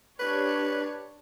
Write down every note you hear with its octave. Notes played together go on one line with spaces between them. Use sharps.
D4 G4 B4 C#5